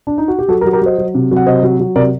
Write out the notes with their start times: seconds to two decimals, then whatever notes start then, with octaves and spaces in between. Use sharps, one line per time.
0.07 D4
0.18 D#4
0.28 F#4
0.39 G4
0.48 F#3 F#4 A4
0.61 G4 A#4
0.65 F#3
0.73 G4 A#4
0.81 F#3 C5 D#5
0.98 F#3
1.15 C3
1.31 F#3
1.36 F#5
1.46 C3 C5 D#5
1.63 F#3
1.80 F#3
1.96 C3 A#4 D5